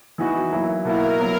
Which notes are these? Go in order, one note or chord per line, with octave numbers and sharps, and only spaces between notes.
E3 B3 D#4 F#4
F#3 A#3 E4
B2 A#3 E4 F#4 A#4
F#3 B3 E4